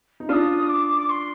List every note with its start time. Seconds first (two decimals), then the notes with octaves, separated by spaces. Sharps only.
0.20 D#4
0.29 D4 F4 D#6 F6
0.69 D6
0.99 D6
1.09 C6